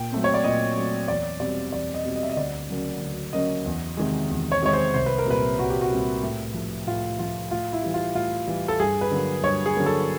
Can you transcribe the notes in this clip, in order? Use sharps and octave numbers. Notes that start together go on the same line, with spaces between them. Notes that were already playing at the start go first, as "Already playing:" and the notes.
Already playing: A#2 G5
F#3 A3 C4
C#5
D5
A#2 D#5
F#3 A3 C4
E2 D5
B2 G3 C4 D5
E2 D5
D#5
B2 G3 C4
D#5
E5
D#5
D2 D5
C#3 F#3 A#3 C#4
D2
C#3 F#3 A#3 C#4 D#5
E2
C3 D#3 G#3
E2
C#5
C3 D#3 G#3 C#5
C5
C2 C5
B4
A#4
A#2 G3 C4 B4
C2 F#4
G4
F#4
A#2 G3 C4
A2
F3 A3
A2 F4
F3 A3 F4
A2 F4
E4
E3 G3
F4
A2 F4
E3 G3
A4
G2 G#4
B4
D3 F#3 A#3
G2 C#5
G#4
D3 F#3 A#3
A4